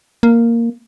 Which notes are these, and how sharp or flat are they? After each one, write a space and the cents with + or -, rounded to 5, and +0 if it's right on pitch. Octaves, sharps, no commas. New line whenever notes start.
A#3 -5